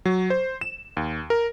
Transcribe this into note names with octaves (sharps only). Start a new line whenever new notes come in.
F#3
C5
E7
D#2
A#4